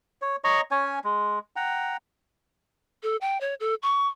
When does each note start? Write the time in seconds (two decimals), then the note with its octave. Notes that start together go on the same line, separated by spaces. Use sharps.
0.22 C#5
0.44 C#5 D#5 A#5 C#6
0.71 C#4 C#5 G#5
1.04 G#3
1.56 F#5 G5 A#5
3.03 A4
3.21 G5
3.41 C#5
3.60 A4
3.83 C#6